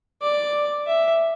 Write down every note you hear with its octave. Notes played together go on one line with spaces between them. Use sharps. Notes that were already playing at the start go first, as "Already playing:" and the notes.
D5
E5